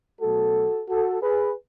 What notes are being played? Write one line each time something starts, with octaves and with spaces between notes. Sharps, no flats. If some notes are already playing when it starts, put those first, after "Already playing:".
B2 F#3 A3 F#4 A4
F#4 A4
G#4 B4